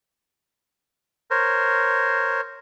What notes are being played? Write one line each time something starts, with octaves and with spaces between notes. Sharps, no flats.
A#4 C5 C#5